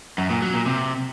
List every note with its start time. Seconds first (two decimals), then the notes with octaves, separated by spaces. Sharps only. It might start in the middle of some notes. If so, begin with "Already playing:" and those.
0.18 F#2
0.30 A#2
0.42 F#3
0.54 A#2
0.66 C3